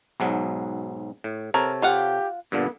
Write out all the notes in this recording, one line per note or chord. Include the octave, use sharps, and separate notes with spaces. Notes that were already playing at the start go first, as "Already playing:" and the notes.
B1 G#2 F#3
A2
C3 A4 A#4 C#5
F4 G4 F5 F#5
G2 A#2 D3 B3